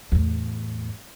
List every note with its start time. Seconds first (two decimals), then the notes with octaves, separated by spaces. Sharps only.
0.12 E2 A2